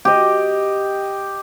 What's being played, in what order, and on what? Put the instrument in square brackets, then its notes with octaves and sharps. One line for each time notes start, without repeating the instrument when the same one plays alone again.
[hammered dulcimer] G4 D#5